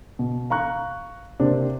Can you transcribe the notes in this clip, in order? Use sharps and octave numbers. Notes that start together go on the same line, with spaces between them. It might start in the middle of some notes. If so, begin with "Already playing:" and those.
B2
F5 A#5 C#6 F#6
C3 A#3 C4 D4